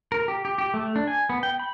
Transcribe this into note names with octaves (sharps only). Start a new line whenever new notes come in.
A#4
G4
G4
G4
A3
D4
G#5
B3
G5
B5